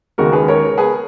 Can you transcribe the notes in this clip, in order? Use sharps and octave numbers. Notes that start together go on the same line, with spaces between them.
D#2 C#3 G#3 F#4 A#4
G#4 B4
A#4 C#5
G#4 B4